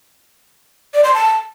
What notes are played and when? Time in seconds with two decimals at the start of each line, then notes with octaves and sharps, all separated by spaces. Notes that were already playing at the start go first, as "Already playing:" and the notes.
0.94 D5
1.04 C6
1.14 A5